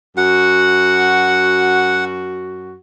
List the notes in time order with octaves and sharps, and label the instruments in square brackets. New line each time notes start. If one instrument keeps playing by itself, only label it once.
[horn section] F#2 F#4 [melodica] F#5